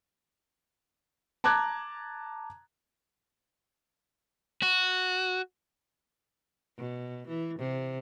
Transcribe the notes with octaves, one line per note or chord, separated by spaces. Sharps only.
A5 A#5 D6 F#6 G#6
F#4
B2
E3
C3